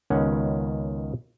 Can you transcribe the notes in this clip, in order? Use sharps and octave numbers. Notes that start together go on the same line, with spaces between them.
C#2 D#3 B3 C#4 F#5